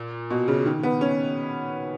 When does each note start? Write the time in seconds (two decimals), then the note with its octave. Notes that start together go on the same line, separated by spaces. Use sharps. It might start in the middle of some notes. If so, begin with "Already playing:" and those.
Already playing: A#2
0.31 B2
0.48 C#3
0.66 D#3
0.83 B3
1.01 C#4